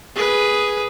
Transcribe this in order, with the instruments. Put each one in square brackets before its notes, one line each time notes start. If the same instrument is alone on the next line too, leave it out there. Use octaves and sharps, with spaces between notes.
[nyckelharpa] G#4 B4